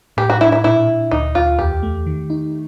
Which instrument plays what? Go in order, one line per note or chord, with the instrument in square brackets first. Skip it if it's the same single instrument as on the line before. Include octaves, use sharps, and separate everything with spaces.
[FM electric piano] A2 [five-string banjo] G4
[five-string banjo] F#4
[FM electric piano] D4 [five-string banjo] E4
[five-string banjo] E4
[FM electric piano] A#2 [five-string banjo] E4
[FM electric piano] A#2
[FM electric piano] D2 [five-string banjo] D#4
[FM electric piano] D2 [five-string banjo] F4
[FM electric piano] E2 [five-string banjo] G4
[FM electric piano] A3
D#3
D#4